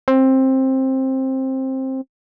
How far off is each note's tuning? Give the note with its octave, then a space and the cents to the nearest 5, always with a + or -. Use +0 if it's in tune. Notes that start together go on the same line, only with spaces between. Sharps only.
C4 +15